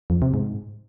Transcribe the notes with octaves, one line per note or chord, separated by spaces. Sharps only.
F2
C3
G#2